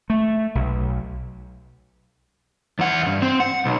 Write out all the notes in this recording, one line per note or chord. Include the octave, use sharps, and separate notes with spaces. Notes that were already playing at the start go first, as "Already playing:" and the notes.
A3
B1
E2 F#5
G2
C4
F#5
B1